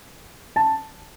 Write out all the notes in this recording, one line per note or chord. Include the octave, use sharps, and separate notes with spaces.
A5